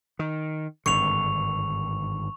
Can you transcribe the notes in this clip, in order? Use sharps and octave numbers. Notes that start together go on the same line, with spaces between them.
D#3
G#1 G2 D3 C#6 F7